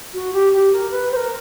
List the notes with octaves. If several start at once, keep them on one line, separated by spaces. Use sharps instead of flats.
F#4
G4
G4
A#4
B4
C5
A#4